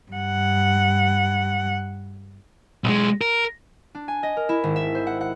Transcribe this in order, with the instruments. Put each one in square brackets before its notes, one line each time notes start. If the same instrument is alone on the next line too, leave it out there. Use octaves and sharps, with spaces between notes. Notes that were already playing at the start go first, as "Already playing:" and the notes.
[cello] G2 F#5
[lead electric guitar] B1 G#3
A#4
[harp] D4
G#5
D#5
A#4
E4
G#1
E5
C5
F#5
F#5